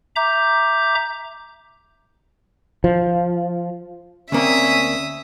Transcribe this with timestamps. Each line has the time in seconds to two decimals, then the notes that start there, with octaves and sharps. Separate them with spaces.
0.16 E5 A#5 D6 G6
2.84 F3
4.32 D2 A#3 C4 C#4 E5 D#6